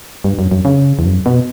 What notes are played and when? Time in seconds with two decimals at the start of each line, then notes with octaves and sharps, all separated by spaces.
0.24 G2
0.39 F#2
0.51 F#2
0.65 C#3
0.99 E2
1.06 F#2
1.26 B2